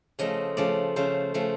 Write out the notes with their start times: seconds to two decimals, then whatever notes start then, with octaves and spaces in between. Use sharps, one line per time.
0.19 C#3 F3 A3 D#5
0.57 C#3 F3 A3 D5
0.96 C#3 F3 A3 C5
1.34 C#3 F3 A3